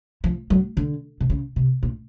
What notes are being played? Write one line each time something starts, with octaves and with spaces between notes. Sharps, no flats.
F3
F#3
D3
C3
C#3
C3
A#2